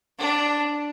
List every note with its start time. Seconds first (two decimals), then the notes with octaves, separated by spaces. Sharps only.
0.19 D4